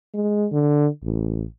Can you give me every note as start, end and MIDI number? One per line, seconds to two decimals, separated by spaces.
0.14 0.47 56
0.52 0.87 50
1.03 1.44 33